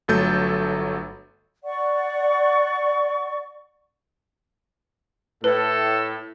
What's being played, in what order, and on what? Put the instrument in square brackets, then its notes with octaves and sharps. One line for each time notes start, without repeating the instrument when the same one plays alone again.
[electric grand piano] G1 F#3 A3 A4 G6 A6
[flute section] D5 F#5 C#6
[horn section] A2 [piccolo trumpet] A4 [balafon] B4